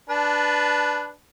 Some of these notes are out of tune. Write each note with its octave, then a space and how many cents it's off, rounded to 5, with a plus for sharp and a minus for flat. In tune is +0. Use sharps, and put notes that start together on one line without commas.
D4 +0 B4 +0 A5 -20